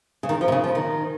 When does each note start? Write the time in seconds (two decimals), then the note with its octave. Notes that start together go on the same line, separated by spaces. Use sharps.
0.23 C#3
0.29 D#3
0.41 F3
0.48 C3
0.52 C#3
0.64 F3
0.75 D#3